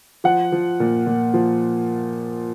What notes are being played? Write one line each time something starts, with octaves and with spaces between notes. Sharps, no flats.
F3 F#5
F3
A#2
A#2
F3